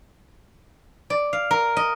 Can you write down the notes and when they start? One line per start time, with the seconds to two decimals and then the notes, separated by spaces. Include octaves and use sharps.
1.10 D5
1.33 F5
1.51 A#4
1.77 D#5